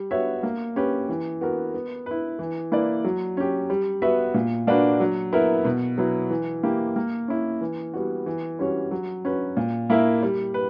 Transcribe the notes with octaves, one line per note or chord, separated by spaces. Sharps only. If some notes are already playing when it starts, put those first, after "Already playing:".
Already playing: G3
B3 F#4 C#5 E5
A#3
C#4 G4 B4
E3
B3 F#4 A#4
B3
E4 B4
E3
A#3 E4 B4 D5
F#3
C#4 G4
G3
B3 F#4 B4 E5
A#2
A#3 D4 F#4 B4
F#3
B3 E4 A#4 E5
B2
F#3 B3 E4
E3
A#3 E4 G4
A#3
C#4 E4
E3
G3 B3 F#4
E3
G3 C#4 F#4 C#5
F#3
C#4 F#4 B4
A#2
A#3 E4 A#4 E5
G3
B4